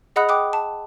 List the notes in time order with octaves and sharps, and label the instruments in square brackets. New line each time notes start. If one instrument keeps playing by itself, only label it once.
[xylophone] G#4 D#5 F#5 B5 D#6 F#6
G5 D6 D#6 F#6
A5